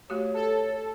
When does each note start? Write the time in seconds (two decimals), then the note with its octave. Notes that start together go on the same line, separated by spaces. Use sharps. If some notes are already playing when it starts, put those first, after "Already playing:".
0.10 A3 F#4 G4 C#5
0.34 A4